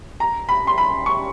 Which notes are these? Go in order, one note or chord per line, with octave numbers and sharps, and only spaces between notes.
A#5
B5
C6
B5
C#6